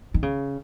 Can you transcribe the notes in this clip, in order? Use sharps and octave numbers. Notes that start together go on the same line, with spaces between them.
D#3
C#3